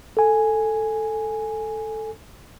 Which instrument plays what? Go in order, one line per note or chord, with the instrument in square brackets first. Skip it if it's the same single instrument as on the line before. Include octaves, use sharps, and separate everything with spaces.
[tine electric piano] A4 G#5